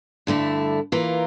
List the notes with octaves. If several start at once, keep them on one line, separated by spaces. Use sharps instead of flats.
G2 D3 A3 E4
E3 A#3 F4 A#4